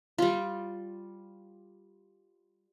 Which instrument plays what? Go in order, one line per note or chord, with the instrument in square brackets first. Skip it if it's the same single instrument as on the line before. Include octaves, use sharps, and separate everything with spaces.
[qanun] G3 F4